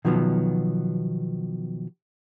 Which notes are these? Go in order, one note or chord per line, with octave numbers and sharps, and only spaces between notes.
B2 D#3 F3 F#3 B3